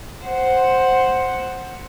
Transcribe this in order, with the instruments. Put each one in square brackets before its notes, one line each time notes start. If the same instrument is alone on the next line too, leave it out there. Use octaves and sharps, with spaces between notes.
[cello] C5 F#5